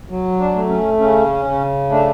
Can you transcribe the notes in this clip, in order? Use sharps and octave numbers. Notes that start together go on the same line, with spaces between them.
F#3
D4
A3
C#4
C#3 C#4
C#3
A3 D4